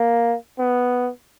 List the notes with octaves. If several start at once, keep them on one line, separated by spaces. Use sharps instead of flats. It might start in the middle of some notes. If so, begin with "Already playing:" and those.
Already playing: A#3
B3